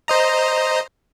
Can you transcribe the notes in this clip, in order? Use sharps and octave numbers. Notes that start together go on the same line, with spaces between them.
C5 D#5 A#5